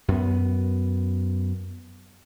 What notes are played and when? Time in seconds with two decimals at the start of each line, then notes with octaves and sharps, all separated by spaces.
0.08 F#2 B3